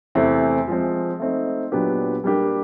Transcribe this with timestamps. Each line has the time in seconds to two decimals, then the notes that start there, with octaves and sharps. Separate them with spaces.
0.15 E2 C3 E3 A3 C4
0.68 F3 G#3 C4
1.20 A3 C4 D#4
1.72 A#2 F#3 B3 D4 G4
2.24 G3 A#3 D4 G4